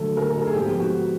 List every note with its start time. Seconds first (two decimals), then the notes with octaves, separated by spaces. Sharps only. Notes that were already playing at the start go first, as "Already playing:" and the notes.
Already playing: D2 D3 F#3 A3 A4
0.17 A#4
0.29 A#4
0.38 A4
0.47 G#4
0.54 G#2 F3 G#3 B3 G4
0.75 G4
0.80 F#4